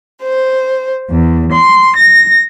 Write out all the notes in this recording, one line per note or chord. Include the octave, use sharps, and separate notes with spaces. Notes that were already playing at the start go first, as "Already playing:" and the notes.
C5
E2
C6
A#6